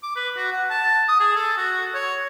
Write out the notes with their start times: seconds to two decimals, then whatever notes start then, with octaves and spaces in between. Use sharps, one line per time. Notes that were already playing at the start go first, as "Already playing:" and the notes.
0.03 D6
0.16 B4
0.37 F#4
0.52 F#5
0.70 A5
1.08 D#6
1.20 G#4
1.36 A4
1.57 F#4
1.94 C#5